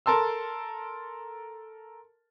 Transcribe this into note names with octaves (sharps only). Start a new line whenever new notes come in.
A4 A#4 A5 C6 E6